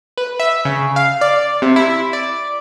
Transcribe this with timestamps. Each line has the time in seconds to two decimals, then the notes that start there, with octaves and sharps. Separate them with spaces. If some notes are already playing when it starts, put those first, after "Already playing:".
0.18 B4
0.40 E5
0.65 C#3
0.96 F5
1.21 D5
1.62 C3
1.76 E4
2.13 D5